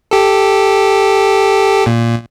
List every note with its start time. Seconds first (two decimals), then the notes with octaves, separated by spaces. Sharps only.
0.11 G4 A4
1.86 A#2